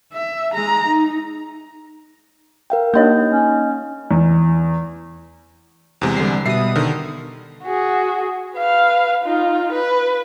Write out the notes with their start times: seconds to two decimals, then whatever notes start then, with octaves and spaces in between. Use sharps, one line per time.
0.13 E5
0.53 G#3 A#5
0.86 D#4
2.70 A#4 F5 G5
2.94 A#3 D4 D#4 C#5 D#5 G6
3.29 C#4
4.11 E2
6.01 E2 C3 G#3
6.16 D3 G3 C7
6.46 B2 G3 B3 E5 D#6 C7
6.75 D3 D#3
7.64 F#4 G#4
8.56 B4 F5
9.24 D#4 F4
9.72 B4